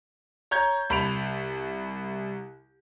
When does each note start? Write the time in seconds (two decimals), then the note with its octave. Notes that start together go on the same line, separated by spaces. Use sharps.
0.51 C#5 A#5 G6 G#6
0.90 C2 B5 D7 F7